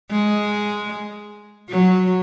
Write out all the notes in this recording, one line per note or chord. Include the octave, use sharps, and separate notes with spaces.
G#3
F#3